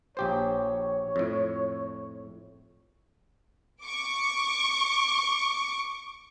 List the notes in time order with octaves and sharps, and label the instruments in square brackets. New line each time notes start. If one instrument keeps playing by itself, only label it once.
[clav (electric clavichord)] A#1 G4 C5 [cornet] C#5
[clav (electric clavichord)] F2 A2
[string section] C#6 D6